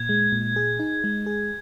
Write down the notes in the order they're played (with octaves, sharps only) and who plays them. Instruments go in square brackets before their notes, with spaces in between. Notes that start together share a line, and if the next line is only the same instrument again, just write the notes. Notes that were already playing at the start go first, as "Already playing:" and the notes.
Already playing: [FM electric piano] A#2 [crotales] G#6
[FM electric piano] G#3
A#2
G#4
D#4
G#3
G#4